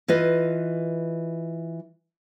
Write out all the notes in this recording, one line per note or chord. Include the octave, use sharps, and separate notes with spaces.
E3 F4 B4 D#5